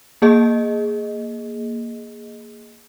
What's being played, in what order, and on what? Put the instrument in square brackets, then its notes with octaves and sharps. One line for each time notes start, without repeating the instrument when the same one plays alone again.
[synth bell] A#3 G#4 D#5